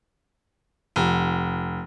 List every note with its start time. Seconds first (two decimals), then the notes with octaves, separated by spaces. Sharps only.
0.96 F1